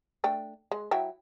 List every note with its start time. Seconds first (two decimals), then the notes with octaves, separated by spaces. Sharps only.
0.24 A3 D4 G5
0.71 G#3
0.91 F#3 E4 G5